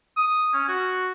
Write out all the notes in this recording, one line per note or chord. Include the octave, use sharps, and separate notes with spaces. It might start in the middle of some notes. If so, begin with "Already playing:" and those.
D#6
C#4
F#4